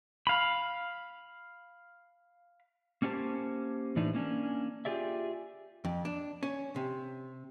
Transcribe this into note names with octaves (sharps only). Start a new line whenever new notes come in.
F5 B5
A#3 C#4 D4 G4 C5 A5
A2 E3 D4 D#4
A#3 C#4 D4
F4 G4 G#4 D5 E5
F2
D4
C#4
C3